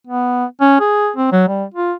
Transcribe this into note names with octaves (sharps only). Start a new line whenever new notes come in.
B3
C#4
G#4
C4
F#3
G3
F4